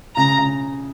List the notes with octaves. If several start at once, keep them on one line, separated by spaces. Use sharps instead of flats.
C#3 A#5
C#3